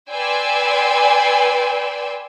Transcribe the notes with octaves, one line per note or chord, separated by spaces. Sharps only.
B4 D5 G5 G#5 C6 E6